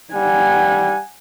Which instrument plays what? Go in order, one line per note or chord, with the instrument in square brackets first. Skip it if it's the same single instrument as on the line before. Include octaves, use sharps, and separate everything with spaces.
[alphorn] G3 [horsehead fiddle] F#5 G#5